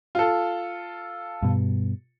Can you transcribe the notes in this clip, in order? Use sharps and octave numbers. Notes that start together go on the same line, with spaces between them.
F4 A4
G2 B2